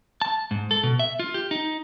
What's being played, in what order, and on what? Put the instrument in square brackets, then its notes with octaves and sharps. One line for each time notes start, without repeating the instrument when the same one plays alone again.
[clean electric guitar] A5
G#2
A4
B2
E5
F4
G4
D#4